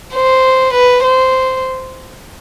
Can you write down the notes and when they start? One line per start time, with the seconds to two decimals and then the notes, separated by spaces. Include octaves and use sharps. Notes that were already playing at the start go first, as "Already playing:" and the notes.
0.14 C5
0.74 B4
1.04 C5